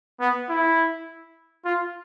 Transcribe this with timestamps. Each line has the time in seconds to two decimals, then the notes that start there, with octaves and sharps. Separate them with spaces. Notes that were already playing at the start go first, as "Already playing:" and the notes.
0.20 B3
0.49 E4
1.65 F4